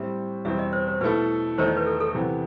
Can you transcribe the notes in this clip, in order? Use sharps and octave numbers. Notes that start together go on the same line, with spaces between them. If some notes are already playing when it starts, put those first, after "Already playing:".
Already playing: A2 G3 C4 E5
E2 B2 G3 C4 E5
D#5
C5
C5
B2 A3 E4 A4 B4
E2 D#3 A3 D#4 A4 C5
D#5
B4
A4
A4
C3 E3 B3